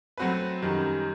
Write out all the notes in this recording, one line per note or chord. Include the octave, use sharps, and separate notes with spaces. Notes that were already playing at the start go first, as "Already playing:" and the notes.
F#3 A3 C4 F#4 B4
F#2 D#3 G3